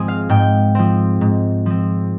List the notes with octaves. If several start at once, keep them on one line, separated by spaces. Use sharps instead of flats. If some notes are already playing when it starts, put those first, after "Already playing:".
Already playing: G#2 F3 C4 G#4
F5
G#2 G5
F3 C4
G#2
F3 C4